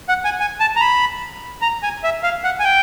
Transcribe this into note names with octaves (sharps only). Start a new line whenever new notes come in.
F#5
G#5
G#5
A5
A#5
B5
A#5
G#5
E5
F5
F#5
G#5
G5